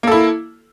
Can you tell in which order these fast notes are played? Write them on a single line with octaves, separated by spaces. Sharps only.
A#3 A4 E4